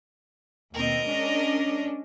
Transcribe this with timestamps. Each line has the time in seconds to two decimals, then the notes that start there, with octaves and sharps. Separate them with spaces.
0.74 D#2 B2 C4 A#4 D#5
1.05 G#3 C#4 D4